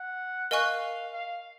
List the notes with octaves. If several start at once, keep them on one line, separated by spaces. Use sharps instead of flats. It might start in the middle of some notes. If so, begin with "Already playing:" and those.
Already playing: F#5
A#4 D#5 F5 G#5 C#6 F#6
F5